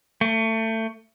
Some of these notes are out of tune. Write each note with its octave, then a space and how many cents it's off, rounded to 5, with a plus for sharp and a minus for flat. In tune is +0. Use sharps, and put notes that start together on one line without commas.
A3 +25